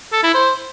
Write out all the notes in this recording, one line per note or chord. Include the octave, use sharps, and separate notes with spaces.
A4
E4
C5